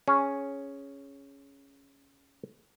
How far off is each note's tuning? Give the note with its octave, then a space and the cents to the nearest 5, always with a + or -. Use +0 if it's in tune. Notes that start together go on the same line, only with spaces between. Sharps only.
C#4 +0 G#4 +0